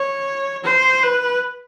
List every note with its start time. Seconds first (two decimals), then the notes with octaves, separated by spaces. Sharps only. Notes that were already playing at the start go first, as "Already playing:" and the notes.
Already playing: C#5
0.64 C5
1.03 B4